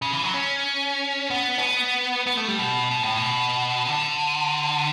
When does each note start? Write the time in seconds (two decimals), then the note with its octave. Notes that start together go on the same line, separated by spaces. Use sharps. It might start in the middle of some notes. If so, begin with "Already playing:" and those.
0.02 C#3
0.12 E3
0.23 F#3
0.34 C#4
1.30 B3
1.58 C#4
1.62 B3
2.27 B3
2.37 A3
2.48 G3
2.59 B2
2.91 B2
3.04 A2
3.18 B2
3.87 D3